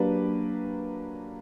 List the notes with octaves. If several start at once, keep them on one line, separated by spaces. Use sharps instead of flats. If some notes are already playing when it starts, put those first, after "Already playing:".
Already playing: F#3 A#3 D4 G4 B4